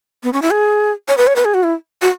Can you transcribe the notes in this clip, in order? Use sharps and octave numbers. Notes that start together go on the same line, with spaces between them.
B3
C#4
E4
G#4
C#5
B4
C#5
B4
G#4
F#4
E4
F#4